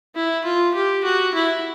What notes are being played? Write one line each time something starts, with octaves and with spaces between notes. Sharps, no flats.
E4
F4
G4
F#4
E4